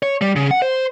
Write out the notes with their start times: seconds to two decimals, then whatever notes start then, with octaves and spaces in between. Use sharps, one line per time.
0.03 C#5
0.21 G3
0.36 C#3
0.51 F#5
0.62 C5